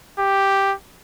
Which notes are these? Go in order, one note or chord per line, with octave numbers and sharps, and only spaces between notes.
G4